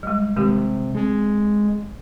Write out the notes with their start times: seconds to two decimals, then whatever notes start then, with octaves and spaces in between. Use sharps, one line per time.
0.03 G3 G#3
0.36 C3 D#3 G#3 G4
0.95 G#3 C4